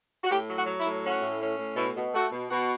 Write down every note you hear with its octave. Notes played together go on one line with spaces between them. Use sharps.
F#4
A2 G4
F#3
F#4
F#3
E4
A2
C#4 F#4
A2
C#4
A2
B2 E4
B2
A3 F#4
B2
B2 F#4